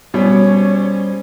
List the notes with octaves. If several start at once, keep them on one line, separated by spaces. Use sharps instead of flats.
B2 G3 C#4 C5 C#5